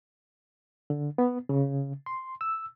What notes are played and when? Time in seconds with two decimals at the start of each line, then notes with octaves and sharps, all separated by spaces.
0.90 D3
1.18 B3
1.49 C#3
2.06 C6
2.41 E6